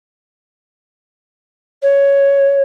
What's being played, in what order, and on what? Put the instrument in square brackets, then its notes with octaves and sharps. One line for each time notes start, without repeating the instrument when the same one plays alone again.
[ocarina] C#5